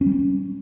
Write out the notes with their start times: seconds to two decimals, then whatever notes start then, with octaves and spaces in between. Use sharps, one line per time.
0.01 C#4
0.06 G3
0.12 C#4